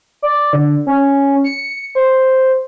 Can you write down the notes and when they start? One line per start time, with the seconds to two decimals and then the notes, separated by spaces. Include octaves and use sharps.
0.22 D5
0.53 D3
0.87 C#4
1.44 C#7
1.95 C5